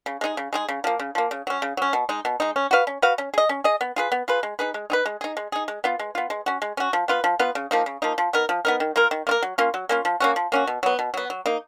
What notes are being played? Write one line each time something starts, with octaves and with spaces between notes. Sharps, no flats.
C#3
G#3 D#4 G#4
C#3
G#3 D#4 G#4
C#3
F3 A#3
C#3
F3 A#3
C#3
F#3 C#4
C#3
F#3 C#4
B2
G#3 D#4
B2
G#3 D#4
C#4
F#4 B4 F5
C#4
F#4 B4 F5
C#4
G#4 D#5
C#4
G#4 D#5
B3
F4 G#4 B4
B3
F4 G#4 B4
G#3
D#4 G#4 B4
G#3
D#4 G#4 B4
G#3
D#4 G#4
G#3
D#4 G#4
G#3
B3 F4
G#3
B3 F4
G#3
C#4 F#4
G#3
C#4 F#4
F3
B3 F4 B4
F3
B3 F4 B4
C#3
F3 A#3 D#4
C#3
F3 A#3 D#4
F3
B3 D#4 A#4
F3
B3 D#4 A#4
D#3
A#3 F4 A#4
D#3
A#3 F4 A#4
F#3
A#3 C#4 F4
F#3
A#3 C#4 F4
F3
A#3 C#4 F#4
F3
A#3 C#4 F#4
B2
F#3 B3
B2
F#3 B3
F#3
A#3 D#4